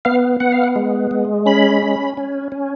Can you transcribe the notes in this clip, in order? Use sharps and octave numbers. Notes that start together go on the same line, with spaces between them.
B3 F5
B3 F#5
F5
F#5
G#3
G#3
C#4 B5
C#4
C#4
C#4